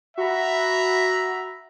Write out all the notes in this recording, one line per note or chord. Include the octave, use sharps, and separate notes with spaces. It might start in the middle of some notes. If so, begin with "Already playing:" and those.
F#4 E5 A#5 B5